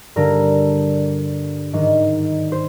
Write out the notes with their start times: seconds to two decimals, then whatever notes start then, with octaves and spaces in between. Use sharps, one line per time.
0.16 G2 D3 A#4
1.73 G#2 D#3
2.52 C5